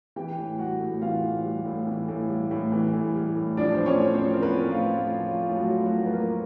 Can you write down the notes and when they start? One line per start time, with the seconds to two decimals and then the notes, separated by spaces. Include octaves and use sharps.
0.16 E3 G4 G5
0.38 A2
0.58 G3 F#4 F#5
0.80 A2
1.02 E3 F4 F5
1.23 A2
1.45 G3
1.65 A2
1.87 E3
2.08 A2
2.29 G3
2.51 A2
2.72 E3
2.93 A2
3.15 G3
3.36 A2
3.57 F3 D4 D5
3.74 A2 C5
3.86 C#4 C#5
4.00 A2
4.14 C4 C5
4.21 F3
4.33 A#4
4.43 F3 B3 B4
4.64 A2
4.71 F4
4.86 A2
5.07 F3
5.29 F3 F4
5.49 A2
5.57 F#3 F#4
5.71 A2
5.85 F#3 F#4
5.92 F3
6.06 B4
6.13 F3 A#3 A#4